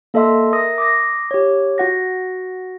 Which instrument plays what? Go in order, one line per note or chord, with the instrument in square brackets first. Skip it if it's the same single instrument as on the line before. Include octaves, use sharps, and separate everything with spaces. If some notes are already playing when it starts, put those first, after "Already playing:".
[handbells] A#3 A4 D#5 E5 C6 E6
A#4 E5 D#6 A#6
D6 D#6 A#6
G4 C#5
F#4 F#5 A#6